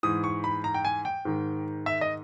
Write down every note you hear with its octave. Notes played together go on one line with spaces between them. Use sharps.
G#2 E3 D#6
C#6
B5
A#5
G5
G#5
G5
G#2 D#3
E5
D#5